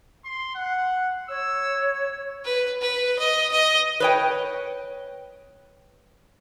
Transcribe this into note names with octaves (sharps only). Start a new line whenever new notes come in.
C6
F#5
C#5 E6
B4
B4
D#5
D#5
B4 C#5 G5